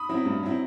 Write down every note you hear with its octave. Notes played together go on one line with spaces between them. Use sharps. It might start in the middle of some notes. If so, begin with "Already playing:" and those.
Already playing: B5 D#6
F#3 C4 E4
G2
F#3 C4 E4